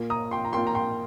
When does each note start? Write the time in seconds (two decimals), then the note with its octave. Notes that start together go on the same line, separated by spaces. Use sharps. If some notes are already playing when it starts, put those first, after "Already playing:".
Already playing: A#2 A#3
0.10 A#5 D#6
0.31 G5 C6
0.45 A#5
0.53 A#2 A#3 G5 C6
0.67 A#5
0.75 G5 C6